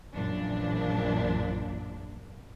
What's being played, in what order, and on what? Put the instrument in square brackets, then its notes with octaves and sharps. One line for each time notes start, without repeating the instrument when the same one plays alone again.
[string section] A#1 F#2 A#2 E3 D4